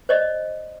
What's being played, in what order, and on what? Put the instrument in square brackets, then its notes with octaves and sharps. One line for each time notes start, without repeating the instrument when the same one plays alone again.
[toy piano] C5 D5 D#5